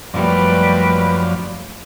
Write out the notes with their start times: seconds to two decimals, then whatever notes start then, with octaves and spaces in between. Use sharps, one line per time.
0.14 F#2 F3 G3 A3 A#3 B4 D5